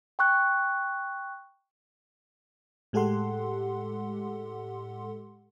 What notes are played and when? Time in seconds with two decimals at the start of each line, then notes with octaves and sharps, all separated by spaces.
0.19 G5 C#6 F#6
2.93 A2 G#3 G4 A4 F#5 C6